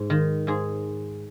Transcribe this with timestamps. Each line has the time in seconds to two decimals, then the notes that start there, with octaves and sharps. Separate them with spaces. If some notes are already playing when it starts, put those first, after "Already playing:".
Already playing: G#2
0.10 D#3
0.47 G#2 G#4